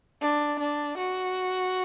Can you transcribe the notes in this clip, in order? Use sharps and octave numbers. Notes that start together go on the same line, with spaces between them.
D4
D4
F#4